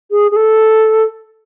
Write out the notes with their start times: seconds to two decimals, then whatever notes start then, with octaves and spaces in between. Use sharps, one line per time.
0.11 G#4
0.31 G#4
0.36 A4